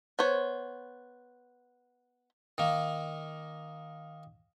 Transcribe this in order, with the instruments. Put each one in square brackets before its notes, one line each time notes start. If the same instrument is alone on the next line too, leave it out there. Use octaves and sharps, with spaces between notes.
[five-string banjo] B3 C5 C#5
[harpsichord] D#3 A#3